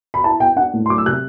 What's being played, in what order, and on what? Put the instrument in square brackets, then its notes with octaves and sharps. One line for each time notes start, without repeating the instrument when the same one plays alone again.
[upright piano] B5
E4 A5
B3 G5
D4 F#5
A2
C6
F#3 D6
E6
C3 F#6